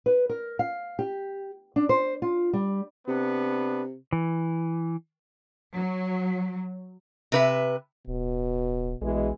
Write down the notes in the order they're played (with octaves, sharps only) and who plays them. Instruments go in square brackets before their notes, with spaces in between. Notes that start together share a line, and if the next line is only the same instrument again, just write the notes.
[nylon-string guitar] B4
A#4
F5
G4
D4
C5
F4
G3
[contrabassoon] C3 [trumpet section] B3 D4 B4
[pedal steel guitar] E3
[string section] F#3
[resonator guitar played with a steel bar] C3 B4 E5
[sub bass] D1 [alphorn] B2
[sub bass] A#1 [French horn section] B2 E3 G#3